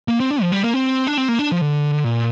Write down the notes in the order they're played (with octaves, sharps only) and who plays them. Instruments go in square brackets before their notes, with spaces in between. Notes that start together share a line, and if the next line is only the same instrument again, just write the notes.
[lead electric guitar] A#3
C4
D4
F3
G3
A#3
C4
D4
C4
A#3
D4
F3
D3
A#2